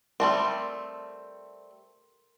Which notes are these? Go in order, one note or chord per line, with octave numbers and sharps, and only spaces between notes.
G3 A3 C4 A#4 C6